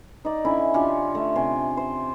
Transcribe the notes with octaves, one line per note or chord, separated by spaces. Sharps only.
D#4 D5
D3 C#4 E4
D3 C#4 F4 G4
A3
C3 G#5 C6
C5